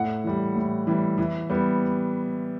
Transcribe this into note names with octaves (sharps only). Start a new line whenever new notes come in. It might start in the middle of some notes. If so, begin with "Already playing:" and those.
Already playing: A2 F#5
E3 G3
A2
E3 G3
E3
G3 B3